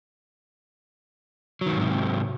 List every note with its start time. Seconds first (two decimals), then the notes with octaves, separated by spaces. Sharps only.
1.61 F#3
1.66 D#3
1.71 F2
1.76 G#2
1.81 C3